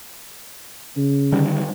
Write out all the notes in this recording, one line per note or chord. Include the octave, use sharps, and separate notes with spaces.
C#3
D3 D#3 G3